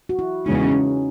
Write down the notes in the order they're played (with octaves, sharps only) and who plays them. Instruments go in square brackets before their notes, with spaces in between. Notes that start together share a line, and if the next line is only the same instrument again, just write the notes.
[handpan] F#4
E4
[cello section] E2 C#3 G#3 C#4 [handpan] D#4
[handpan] C#4